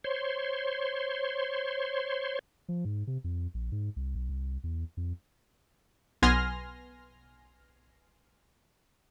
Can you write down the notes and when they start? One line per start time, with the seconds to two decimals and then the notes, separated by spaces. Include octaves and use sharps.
0.04 C5 C#5 C6
2.68 F3
2.85 G#2
3.07 C3
3.24 F2
3.54 A#1
3.72 G#2
3.96 C2
4.15 B1
4.29 C2
4.64 E2
4.97 F2
6.22 B1 B3 G#5 C6 F6 A#6